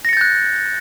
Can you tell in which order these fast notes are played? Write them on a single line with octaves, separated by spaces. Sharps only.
A#6 C#7 A6 G6 F#6